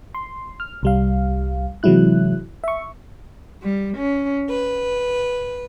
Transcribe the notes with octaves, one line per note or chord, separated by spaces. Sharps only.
C6
F6
C2 G3 F5
C3 E3 F#3 G#3 E4 F#6
E5 C#6
G3
C#4
B4